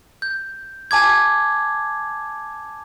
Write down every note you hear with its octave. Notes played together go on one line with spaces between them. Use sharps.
G6
G#5 A5 D6 G#6